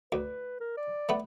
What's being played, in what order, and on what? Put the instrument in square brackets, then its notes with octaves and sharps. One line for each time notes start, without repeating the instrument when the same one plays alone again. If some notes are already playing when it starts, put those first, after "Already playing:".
[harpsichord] D2 [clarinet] B4
[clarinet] A#4
D5
[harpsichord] A3 B3